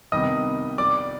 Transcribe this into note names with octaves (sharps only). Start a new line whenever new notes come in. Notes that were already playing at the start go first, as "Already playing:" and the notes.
C2 C3 D#3 G3 B3 D#5 D#6
D5 D6